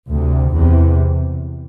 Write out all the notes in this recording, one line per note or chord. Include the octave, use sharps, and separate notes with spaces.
D2 C3
E2 C3